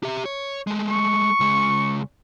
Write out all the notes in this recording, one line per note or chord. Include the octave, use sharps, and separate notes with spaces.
G4 E5
C#5
G#3 A3
C#6
C#2 G#3